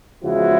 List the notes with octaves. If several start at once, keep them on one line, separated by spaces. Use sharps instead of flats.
E2 C#3 F3 G#3 E4 F#4